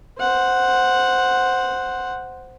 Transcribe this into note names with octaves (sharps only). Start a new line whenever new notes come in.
C5 F#5